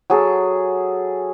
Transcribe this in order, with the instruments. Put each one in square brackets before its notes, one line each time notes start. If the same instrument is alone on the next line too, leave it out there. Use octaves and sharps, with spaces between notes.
[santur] F#3 G#4 A4